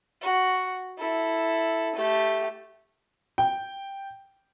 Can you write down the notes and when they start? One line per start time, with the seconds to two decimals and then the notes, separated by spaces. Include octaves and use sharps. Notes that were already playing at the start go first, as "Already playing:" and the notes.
0.21 F#4
0.98 E4 A4
1.95 A3 G4
3.38 G5